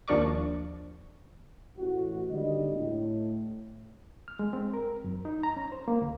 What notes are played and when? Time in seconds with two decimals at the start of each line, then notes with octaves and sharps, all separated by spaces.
0.08 D#2 F3 D4 A#4 D5 C#6
1.77 A1 F#4
2.30 G#1 D3 G3 D#5
2.74 A2
4.28 F6
4.39 G#3
4.53 C4
4.74 A#4
5.04 F#2
5.25 D#4
5.43 A#5
5.56 C#4
5.72 C5
5.88 A#3
6.02 D2